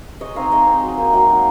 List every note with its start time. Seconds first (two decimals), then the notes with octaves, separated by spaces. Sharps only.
0.21 G#3 C#5 D#5
0.36 C4 D#4 D#5 F5
0.51 G#3 C#5 D#5
0.67 C4 D#4
0.83 F#3
0.98 A#3 D#4
1.13 F#3 F5 G5
1.29 A#3 D#4